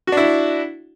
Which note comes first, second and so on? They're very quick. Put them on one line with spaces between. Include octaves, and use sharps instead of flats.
F#4 D4 E4